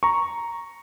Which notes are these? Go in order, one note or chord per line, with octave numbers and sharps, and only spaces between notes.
A#5 C#6